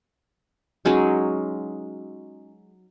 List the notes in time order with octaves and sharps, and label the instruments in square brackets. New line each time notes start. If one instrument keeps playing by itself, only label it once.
[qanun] F#3 G#3 C#4 D#4